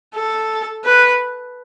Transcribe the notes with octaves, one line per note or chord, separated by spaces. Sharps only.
A4
B4